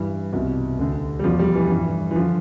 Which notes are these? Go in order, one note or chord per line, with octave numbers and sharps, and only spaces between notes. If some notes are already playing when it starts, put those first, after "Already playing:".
Already playing: G2 E3
C2 B2
D2 D3
G3
E2 B2 F3
G3
E3
G2 E3
E3
D3 F3